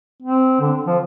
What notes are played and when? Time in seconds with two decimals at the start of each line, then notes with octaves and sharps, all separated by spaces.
0.23 C4
0.60 D3
0.86 F3